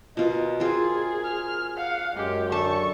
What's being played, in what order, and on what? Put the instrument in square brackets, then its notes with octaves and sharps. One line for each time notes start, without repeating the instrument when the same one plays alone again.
[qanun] B2 F4 [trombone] A#4 [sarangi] D#5
[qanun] C4 F4 [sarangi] G#4
[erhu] F6
[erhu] F5 [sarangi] F#5
[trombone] F#2 [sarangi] G#3 [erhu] G4
[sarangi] D3 [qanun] A4 A5 [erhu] C#6